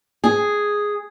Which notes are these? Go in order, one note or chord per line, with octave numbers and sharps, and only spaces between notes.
G#4